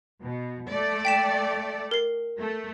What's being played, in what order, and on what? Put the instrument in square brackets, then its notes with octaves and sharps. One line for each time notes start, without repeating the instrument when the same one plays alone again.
[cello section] B2
A3 D5
[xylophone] G5 B6 E7
A#4 C7
[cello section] A3